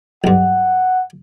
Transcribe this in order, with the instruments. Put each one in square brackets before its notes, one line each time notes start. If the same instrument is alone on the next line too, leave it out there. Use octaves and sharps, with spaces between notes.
[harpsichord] B1 G2 [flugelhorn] F#5